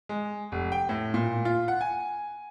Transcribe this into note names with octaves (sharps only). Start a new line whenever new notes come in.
G#3
F1
G5
A2
A#2
F4
F#5
G#5